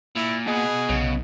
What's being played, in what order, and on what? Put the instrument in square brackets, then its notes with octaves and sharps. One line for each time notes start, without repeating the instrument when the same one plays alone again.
[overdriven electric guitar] A#2 [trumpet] E4
[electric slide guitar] B3 D#5 F#5 [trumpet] G#4
[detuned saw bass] B1 [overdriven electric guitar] C#3